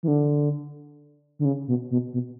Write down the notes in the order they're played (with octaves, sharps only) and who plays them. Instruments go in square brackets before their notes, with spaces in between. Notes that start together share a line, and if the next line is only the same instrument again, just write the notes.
[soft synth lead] E3
D3
D3
C#3
B2
B2
B2